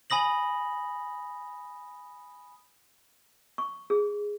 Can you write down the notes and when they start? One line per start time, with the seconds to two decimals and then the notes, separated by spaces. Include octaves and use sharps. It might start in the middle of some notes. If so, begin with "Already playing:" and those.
0.10 G#5 B5 D#6 A#6 F#7
3.58 C#6
3.90 G#4